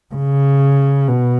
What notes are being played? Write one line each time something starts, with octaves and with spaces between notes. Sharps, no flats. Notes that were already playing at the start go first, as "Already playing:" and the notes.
C#3
B2